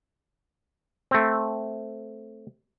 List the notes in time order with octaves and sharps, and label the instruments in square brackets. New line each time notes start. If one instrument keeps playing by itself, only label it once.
[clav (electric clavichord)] A3 C4